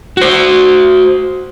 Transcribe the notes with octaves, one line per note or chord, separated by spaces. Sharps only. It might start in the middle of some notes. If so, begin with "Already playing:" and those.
F#4 C5